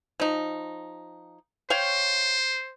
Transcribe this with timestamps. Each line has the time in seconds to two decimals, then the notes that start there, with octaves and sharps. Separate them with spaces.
0.20 F3 D#4
1.70 C5 C#5 F5 G5